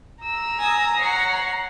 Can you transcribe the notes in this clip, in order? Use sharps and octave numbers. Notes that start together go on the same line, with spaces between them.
A#5 E6
G#5 D#6
C#5 F#5 C7